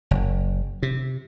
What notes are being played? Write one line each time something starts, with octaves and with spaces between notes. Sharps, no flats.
F#1
C3